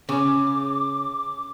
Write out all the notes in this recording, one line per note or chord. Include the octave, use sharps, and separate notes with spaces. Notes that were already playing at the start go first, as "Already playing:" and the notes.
C#3 C#4 D6